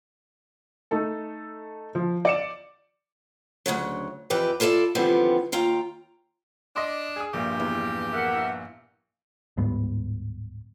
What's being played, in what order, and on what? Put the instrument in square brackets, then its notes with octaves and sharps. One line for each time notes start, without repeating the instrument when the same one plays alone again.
[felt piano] A3 D#4 A4
F3
D5 C#7 E7
[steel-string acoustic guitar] D2 G#2 C#3 F#3
F2 E3 G4 B4
E4 F4 A4 A#4 D5
D3 E3 F3 G3 B3 C4
D#2 F4 G5 A#5
[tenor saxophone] D4 [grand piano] D#5 C6 D6
[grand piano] G#4 D#6
[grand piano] A#1 G2 A#2 [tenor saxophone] G4
[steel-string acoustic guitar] E2
[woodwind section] A#4 E5 F#5
[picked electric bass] D1 G#2 G3 B3